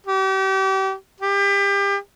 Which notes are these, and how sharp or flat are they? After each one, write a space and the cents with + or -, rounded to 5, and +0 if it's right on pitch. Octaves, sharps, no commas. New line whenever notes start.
G4 -35
G4 +30